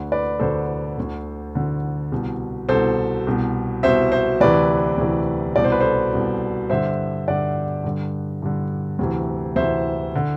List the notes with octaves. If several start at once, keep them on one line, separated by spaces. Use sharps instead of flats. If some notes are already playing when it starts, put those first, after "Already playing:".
Already playing: D2 D3
B4 D5
D2 D3 A4 C5
D2 D3
D2 D3
C2 B2
C2 B2 A4 C5
C2 B2
C2 B2 C5 E5
C5 E5
D2 C3 E3 B4 D5
D2 C3 E3
C2 B2 D5
C5
B4
A4 C5
C2 B2
G2 D3 C5 E5
G2 D3 D5 F#5
G2 D3
G2 D3
D2 C3 E3
D2 C3 E3 C5 E5
D3